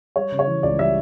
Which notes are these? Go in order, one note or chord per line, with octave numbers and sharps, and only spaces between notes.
G3 C#5
C#3
C#5
E3
C#2 D5
G3 E5